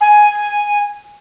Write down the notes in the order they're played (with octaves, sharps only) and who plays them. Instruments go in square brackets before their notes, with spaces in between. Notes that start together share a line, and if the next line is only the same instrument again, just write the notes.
[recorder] G#5